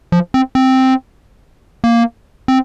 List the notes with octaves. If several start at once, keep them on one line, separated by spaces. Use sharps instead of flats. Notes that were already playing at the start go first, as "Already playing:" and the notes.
F3
C4
C4
A#3
C4